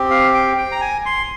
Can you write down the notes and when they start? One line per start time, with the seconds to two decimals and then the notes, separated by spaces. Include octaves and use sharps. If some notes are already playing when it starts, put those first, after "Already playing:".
Already playing: C4 G4
0.10 F5
0.34 G5
0.58 G5
0.72 A#5
0.81 G#5
1.06 C6